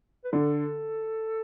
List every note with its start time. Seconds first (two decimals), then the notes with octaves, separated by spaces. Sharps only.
0.24 B4
0.32 D3 A4